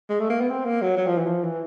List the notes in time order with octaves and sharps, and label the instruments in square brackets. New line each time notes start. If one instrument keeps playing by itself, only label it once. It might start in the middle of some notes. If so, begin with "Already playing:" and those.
[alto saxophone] G#3
A3
A#3
B3
C4
A#3
F#3
F#3
F3
E3
F3
E3